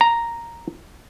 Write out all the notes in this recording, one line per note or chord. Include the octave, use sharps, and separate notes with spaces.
A#5